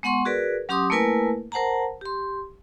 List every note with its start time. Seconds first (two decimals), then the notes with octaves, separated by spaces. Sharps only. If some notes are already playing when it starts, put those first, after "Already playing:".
0.03 G#3 B3 F#5 C6 C#6
0.25 F#4 G#4 A#4 B4 D5
0.69 F#3 C#4 G4 C6 D6 D#6
0.90 A3 A#3 E4 A#4 B4 G#5
1.52 A#4 C5 F#5 A5 A#5
2.01 G4 C6